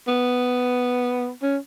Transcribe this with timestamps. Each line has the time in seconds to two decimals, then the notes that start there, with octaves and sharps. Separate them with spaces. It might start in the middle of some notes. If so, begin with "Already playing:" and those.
0.07 B3
1.42 C#4